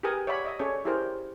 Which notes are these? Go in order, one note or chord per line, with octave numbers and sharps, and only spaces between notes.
G4 G#4 A#4 B4 G#5 D#6
C#5 D5 E5 F#5 B5
D#5 E5 D#6
C#4 G#4 A4 C#5 D5 C#6
E4 G4 G#4 A#4 C5 D5